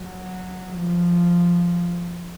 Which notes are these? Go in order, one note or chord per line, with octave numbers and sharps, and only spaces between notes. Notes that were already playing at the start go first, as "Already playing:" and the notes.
Already playing: F#3
F3